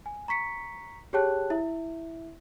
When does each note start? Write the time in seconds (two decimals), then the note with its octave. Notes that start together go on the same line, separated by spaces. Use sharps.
0.06 G#5
0.28 A#5 C#6 B6 C#7
1.13 G4 G#4 C#5 G5 A5 F#6
1.50 E4 E5